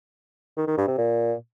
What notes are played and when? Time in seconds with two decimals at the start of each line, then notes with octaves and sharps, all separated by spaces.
0.57 D#3
0.67 D#3
0.77 G2
0.88 C3
0.98 A#2